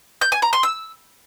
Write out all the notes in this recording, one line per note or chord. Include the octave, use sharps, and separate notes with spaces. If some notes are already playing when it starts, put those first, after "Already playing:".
G6
G#5
A#5
C6
E6